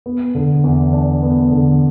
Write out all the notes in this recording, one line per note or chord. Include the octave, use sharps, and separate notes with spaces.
B3
D3
E2
D4
B3
D3